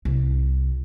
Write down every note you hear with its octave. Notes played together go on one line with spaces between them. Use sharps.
C2